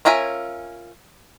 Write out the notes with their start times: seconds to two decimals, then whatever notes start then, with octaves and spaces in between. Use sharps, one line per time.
0.05 C#4 F4 A#4 E5 G#5